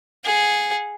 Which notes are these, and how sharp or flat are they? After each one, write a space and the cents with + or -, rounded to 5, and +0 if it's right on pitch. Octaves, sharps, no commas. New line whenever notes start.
G#4 +0 F#5 -35